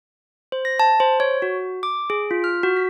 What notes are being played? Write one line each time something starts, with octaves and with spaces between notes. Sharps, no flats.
C5
A#6
A5
C5
C#5
F#4
D6
G#4
F4
F6
F#4
B6